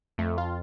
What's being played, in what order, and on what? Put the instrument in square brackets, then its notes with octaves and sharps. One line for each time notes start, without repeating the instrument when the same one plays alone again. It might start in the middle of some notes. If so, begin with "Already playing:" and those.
[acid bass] F2 [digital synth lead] A3
[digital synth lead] F4